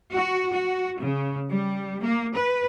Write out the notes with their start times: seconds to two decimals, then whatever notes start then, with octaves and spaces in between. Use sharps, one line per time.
0.14 F#4
0.51 F#4
1.00 C#3
1.52 G3
2.03 A#3
2.35 B4